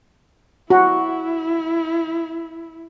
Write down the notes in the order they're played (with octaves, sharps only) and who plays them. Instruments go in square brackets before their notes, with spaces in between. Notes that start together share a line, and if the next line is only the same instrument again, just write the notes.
[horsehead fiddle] E4 [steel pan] F#4